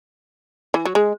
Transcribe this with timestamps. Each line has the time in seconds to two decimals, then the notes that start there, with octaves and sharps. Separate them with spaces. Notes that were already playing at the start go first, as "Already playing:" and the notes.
0.74 E3
0.85 F#3
0.95 G#3